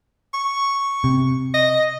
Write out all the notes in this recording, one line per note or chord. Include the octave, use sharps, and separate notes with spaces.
C#6
C3
D#5